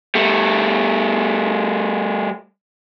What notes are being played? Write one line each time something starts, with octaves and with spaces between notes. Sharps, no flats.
G3 A3